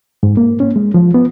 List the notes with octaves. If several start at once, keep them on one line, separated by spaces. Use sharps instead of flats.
G#2
A#3
C#4
G#3
F3
B3